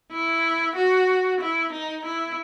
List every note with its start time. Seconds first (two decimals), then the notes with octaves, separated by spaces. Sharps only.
0.11 E4
0.75 F#4
1.40 E4
1.72 D#4
2.05 E4